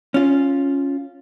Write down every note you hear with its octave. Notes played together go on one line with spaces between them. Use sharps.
C#4 F4